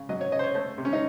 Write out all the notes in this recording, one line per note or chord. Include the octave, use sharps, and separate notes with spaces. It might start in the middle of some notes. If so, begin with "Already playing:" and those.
Already playing: C#3
F#3 D#5
C#5
C#3 D#5
C5
C#5
A3 C5
C3
C#4
D#4